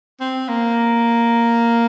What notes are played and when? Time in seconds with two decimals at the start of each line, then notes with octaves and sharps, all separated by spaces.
0.20 C4
0.48 A#3